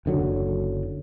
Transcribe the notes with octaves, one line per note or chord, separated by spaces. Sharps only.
F#1 D3 F#3